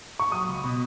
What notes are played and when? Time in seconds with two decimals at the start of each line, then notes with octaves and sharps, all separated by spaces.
0.20 C#6
0.32 F#3 D#6
0.48 C#2
0.64 B2